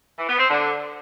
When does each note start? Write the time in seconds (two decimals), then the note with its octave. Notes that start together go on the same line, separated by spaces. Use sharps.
0.18 E3
0.28 B3
0.39 C4
0.49 D3